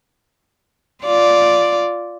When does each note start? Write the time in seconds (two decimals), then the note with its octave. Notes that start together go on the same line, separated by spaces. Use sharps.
1.04 F4 D5